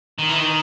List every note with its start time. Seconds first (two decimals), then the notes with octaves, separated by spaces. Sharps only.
0.19 D#3
0.29 E3
0.39 D#3